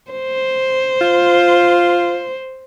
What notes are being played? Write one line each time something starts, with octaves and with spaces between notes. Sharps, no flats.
C5
F4